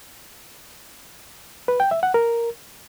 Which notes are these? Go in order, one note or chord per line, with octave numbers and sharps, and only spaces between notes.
B4
G5
E5
F#5
A#4